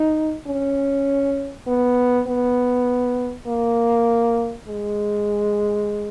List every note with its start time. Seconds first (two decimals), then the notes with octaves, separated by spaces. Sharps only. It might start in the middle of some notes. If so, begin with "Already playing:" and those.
Already playing: D#4
0.47 C#4
1.67 B3
2.27 B3
3.47 A#3
4.68 G#3